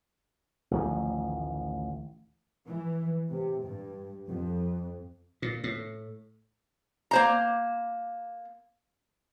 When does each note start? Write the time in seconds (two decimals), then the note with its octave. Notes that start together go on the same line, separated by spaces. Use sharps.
0.71 A1 D2 D#3 F3
2.67 E3
3.32 C3
3.63 G2
4.28 F2
5.42 A#2
5.64 A2
7.11 A#3 C5 A#5